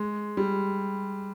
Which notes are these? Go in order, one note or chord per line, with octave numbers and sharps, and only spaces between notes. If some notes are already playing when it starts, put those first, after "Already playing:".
Already playing: G#3
G3